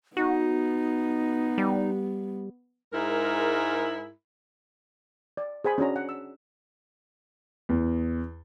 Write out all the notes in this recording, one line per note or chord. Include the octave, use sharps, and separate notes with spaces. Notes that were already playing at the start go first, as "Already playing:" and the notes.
B3 D#4 F#4
G3
G#2 G#3 E4 A#4
D5
G#4 C5 G#5 B5
C#4 D4 F#4 A#5
F#5
E6
E2